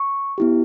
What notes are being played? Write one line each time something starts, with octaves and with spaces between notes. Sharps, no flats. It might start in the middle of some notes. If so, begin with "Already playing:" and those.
Already playing: C#6
B3 E4 G4